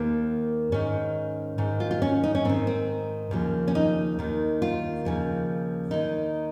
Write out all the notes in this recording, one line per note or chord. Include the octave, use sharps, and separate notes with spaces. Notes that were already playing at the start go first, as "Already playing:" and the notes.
Already playing: D#2 D#3 A#3
G#2 D#3 C#4
G#2 D#3
F4
F4
C#4
D#4
C#4
G#2 D#3 C4
C4
D#2 C#3 F3
C#4
D#4
D#2 D#3
F4
D#2 C#3 F3
D#2 D#3 D#4